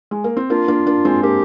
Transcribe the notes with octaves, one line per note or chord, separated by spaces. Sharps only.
G#3
A#3
C4
A#3 D4 F4
A#3 D4
A#3 D4
G#3 C4
A#3 D4 G4